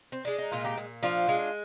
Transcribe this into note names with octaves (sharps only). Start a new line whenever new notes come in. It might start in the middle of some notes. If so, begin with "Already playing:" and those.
C4
G#3 D4
D#4
A#2 F4
D#4 G4
A#2
F3 D4 F4
G#3